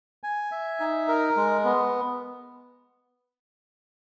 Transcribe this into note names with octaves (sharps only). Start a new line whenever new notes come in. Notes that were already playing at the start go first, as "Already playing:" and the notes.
G#5
E5
D#4
A#4
G#3
B3